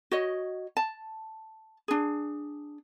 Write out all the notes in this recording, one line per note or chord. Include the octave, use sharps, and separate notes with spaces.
F#4 C#5 D#5
A5
D4 G#4